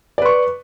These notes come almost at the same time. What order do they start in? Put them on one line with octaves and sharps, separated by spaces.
D5 B4 C#6